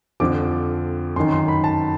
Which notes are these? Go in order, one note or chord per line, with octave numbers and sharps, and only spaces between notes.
F2 D3 F3 D6
F#2 D#3 C6
C6
B5
A5